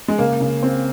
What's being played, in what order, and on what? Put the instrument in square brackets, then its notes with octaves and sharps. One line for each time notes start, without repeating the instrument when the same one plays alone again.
[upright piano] G#3
[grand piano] C#3 [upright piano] A#3
[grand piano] C#3
C4